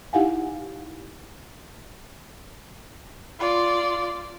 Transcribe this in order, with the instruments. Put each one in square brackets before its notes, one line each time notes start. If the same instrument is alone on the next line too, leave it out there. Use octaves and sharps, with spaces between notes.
[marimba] D#4 E4 G4 F5 F#5 G#5
[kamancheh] F4 D5